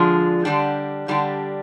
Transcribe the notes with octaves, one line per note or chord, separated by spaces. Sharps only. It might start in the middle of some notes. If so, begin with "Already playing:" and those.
Already playing: D3 F3 G#3 D4 F4
D3 G3 D4 G4
D3 G3 D4 G4